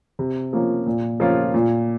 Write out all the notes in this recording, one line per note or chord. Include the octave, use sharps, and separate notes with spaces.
C3
F3 A#3 C#4
A#2
F3 A#3 C#4 F4
A#2